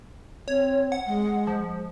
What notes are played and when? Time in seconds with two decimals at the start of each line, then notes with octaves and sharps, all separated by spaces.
0.48 C4 C#5
0.92 F#5
1.06 G#3
1.47 F3